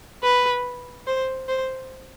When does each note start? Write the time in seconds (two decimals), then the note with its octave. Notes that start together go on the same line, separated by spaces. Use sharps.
0.23 B4
1.07 C5
1.48 C5